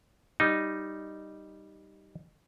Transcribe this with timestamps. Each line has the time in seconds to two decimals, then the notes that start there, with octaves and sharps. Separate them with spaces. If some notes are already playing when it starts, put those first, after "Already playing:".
0.40 G3 D#4